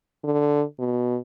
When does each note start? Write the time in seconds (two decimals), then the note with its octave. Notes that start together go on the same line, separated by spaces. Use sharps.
0.24 D3
0.79 B2